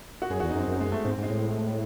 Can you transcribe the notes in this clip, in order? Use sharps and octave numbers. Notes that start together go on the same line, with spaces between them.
F#4
F#2 G#4
E2 F#4
D#4
F#2 C4
F#2
G#3
A3
G#2 C4
G#2
G#3
A2